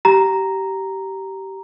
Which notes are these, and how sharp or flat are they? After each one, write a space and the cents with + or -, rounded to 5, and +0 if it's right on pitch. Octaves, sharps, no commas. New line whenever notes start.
G4 -20 A#5 +0